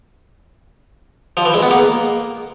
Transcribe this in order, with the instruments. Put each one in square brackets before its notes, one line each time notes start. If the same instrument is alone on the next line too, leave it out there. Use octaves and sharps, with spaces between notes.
[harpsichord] F3
E3
G#3
B3
A#3